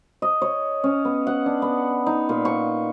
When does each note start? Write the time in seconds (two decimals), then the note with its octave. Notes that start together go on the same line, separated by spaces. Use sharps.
0.22 D#5
0.42 C#5
0.84 C#4
1.05 B3
1.27 F#5
1.46 D4
1.62 B3
2.06 D#4
2.29 A#2
2.45 C#6